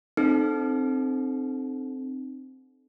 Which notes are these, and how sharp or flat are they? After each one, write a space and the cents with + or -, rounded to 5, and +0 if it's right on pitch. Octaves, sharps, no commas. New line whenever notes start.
C4 +0 D#4 -35 A4 -20